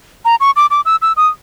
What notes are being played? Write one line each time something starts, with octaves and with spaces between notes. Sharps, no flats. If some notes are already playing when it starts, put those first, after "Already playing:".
A#5
C#6
D6
D6
E6
E6
D#6